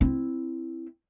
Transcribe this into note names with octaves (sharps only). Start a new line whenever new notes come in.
C4 E4